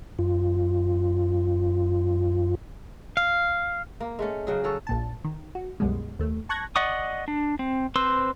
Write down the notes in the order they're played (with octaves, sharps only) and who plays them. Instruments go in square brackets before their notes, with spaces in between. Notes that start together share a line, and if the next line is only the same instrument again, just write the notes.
[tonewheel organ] F#2 F4
[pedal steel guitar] F5
[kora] A#3
G#3 A3 C#4
C#3 F#3 G#4
F#3 A4 C#5
[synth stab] A#1 A#2 A5
D#3
F#4
C2 F#2 B2 G3 G#3
D#2 A3
A5 C#6 F#6 G#6 A#6
[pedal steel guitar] D5 D#5 F#5 C#6 D#6
D4
C4
C4 B4 C5 C6 E6